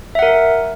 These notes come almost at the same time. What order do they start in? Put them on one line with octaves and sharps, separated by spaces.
E5 F#5 A#4